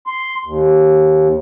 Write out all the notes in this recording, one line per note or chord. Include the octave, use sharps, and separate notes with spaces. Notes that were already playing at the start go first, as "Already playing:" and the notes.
C6
D#2